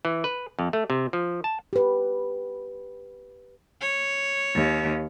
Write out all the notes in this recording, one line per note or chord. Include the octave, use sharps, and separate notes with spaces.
E3
B4
F2
A3
C3
F3
A5
G4 B4
C#5
D#2